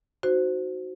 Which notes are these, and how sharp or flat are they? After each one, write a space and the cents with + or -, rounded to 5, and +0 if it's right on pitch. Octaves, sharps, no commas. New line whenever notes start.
D#4 +0 F#4 +0 C5 -10